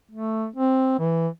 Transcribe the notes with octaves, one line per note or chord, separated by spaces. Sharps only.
A3
C4
E3